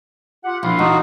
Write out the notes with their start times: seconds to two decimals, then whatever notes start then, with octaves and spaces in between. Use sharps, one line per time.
0.43 F4 G4 F#5
0.63 A#1 E4 F4
0.79 A1 D#4 F#4